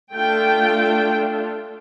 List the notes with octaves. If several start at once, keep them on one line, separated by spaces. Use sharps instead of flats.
A3 D4 F4 G5